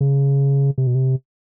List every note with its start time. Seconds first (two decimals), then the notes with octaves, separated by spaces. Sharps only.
0.01 C#3
0.78 C3
0.87 B2
0.95 C3